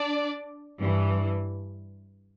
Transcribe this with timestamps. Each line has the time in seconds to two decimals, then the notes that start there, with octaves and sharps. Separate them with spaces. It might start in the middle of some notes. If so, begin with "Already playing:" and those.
Already playing: D4 D5
0.80 G2 E3